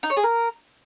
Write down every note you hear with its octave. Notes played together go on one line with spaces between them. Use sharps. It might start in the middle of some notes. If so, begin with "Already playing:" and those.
D#4
C#5
G#4
A#4